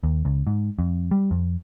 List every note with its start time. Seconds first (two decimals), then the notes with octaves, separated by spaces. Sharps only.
0.03 D#2
0.25 C#2
0.47 G#2
0.79 F2
1.11 G3
1.31 F2